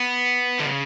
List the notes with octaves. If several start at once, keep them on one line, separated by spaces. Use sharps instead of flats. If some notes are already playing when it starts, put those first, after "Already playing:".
Already playing: B3
D3
C#3